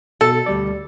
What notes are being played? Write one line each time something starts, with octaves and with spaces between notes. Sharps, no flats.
B2 A4
D2 G3 D5